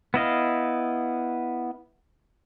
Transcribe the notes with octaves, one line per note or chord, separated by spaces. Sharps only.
B3 E4 D#5 F5